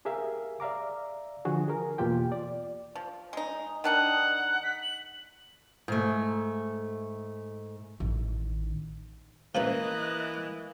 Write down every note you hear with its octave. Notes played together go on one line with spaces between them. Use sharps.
G4 G#4 A#4 E5 F5
D5 E5 F5 A#5 D6
D3 F3 F#4 G#4
G#4 A#4
E2 B2 A#3 F4 G4 G5
D5
F3
G#3 D#4
D#3 D4 D#4 F#5
B6
F#7
G#2 A3
A1 D#3
E3 F3 A#3 C#4 B4 D#5 F#6